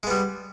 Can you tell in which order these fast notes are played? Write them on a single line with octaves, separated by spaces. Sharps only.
G#3 B3 G3